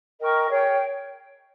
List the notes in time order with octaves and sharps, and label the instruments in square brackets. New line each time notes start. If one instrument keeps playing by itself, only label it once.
[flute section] A#4 D#5 G5 C#6
G#4 C#5 G5